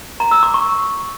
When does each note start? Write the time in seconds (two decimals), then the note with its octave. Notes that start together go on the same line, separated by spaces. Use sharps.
0.20 A#5
0.31 E6
0.43 D6
0.54 C#6